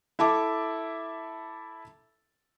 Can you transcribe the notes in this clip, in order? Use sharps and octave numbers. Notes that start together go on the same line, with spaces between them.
E4 A4 E5 A5 D6